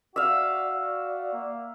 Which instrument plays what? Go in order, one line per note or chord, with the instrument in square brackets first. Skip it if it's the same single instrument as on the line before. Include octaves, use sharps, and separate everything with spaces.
[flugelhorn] F#4 [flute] D5 [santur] E5 F5
[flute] D5
[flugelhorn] A#3